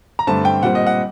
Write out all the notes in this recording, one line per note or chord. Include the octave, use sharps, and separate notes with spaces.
A#5
G2 D3 A3 C4 A5
G5
A#2 G3 C4 F#5
D#5
F#5